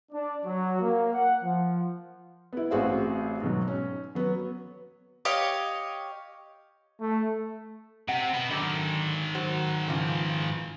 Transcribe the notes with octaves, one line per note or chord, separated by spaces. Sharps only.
D4
F#3
A#3
F#5
F3
B3 E4
A1 C4 F#4 G#4 C5 F5
G#2 B2 F#3
C#4
F#3 B3
G4 C#5 D#5 F5
A3
C3 F#5
B2 B3
G#2 D3 D#3 F#3
F#3 F#4 C5
C#3 E3 F3